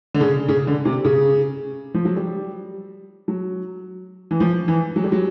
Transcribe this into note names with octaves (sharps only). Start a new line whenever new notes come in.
D3
C#3
C#3
D3
C3
C#3
F3
F#3
G3
F#3
E3
F3
E3
F#3
G3
F#3